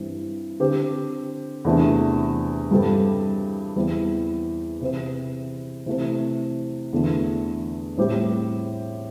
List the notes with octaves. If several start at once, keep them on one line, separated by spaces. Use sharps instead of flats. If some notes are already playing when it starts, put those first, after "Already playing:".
Already playing: G2 E3 C4
D3 C4 G4
E2 C3 A3 D4
G2 G3 C4 A4
E2 E3 G3 C4 E4
C3 E3 C4 E4
C3 E3 A3 C4
E2 D3 A3
A2 G3 C4 G4